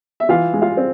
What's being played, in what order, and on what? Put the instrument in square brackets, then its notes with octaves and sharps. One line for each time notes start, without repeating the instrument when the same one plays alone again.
[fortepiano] E5
E3 F4 F5
G#3
F4 F5
C4